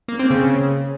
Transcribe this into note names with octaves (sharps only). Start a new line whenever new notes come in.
A#3
C4
C#3